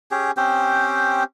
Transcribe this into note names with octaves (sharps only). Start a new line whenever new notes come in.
C#4 G4 G#4
C4 C#4 G4 C5